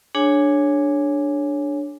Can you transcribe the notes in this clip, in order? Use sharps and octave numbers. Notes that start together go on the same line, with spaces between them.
D4 G#4 C#5 G#5